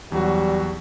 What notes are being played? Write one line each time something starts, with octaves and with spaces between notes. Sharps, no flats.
E2 F#3 G3 F#4